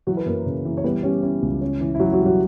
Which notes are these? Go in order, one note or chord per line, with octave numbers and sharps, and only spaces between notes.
E3 F#3 F#4
B4
F#2 A#3 A#4
C#3
E3
C#5
G3 B3 B4
G3 C#4 G4
C#4 E4
C#2
C#4
E3
E4
E3 F#3 F#4
F#3 F#4
G3
F#3 F#4